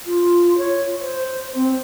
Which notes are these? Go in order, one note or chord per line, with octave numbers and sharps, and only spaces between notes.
F4
C#5
C5
C4